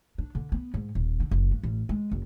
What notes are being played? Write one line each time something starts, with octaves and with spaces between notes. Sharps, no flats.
D4
D3
B3
G#2
D#1
D3
F#1
G2
A1
G#3
F#1